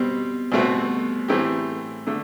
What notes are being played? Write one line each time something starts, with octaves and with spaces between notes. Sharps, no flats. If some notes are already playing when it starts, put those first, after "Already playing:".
Already playing: B2 G3 C4
C2 B2 A3 C4 F#4
A2 E3 A3 C4 G4
D3 A3